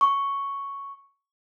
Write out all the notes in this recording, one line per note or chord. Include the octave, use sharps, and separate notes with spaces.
C#6